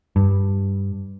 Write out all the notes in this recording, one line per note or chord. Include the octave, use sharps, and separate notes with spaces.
G2